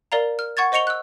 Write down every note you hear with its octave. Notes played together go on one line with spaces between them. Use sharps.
A#4 D5 F5 A#5
F6
F#5 C#6 G#6 A6
C5 D#5 C#6 C#7 F7 G7
E6 F#6